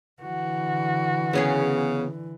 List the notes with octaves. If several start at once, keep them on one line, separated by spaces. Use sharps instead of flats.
D3 E3 F#4
C#3 B3 C#4 G#4